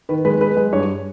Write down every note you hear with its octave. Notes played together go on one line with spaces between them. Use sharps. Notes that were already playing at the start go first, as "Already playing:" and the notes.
D#3 B4
G#3 B4
G#3 B4
G#3
G2 C#5